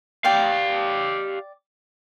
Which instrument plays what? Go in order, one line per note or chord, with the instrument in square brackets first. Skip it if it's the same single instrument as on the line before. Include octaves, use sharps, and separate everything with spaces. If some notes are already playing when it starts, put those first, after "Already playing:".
[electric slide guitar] G4 F5 [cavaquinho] D5 G5